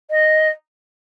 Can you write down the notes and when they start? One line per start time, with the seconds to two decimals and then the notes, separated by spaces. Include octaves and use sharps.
0.10 D#5